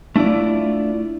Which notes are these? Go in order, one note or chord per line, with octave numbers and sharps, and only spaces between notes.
A3 D4 E4 F4 D5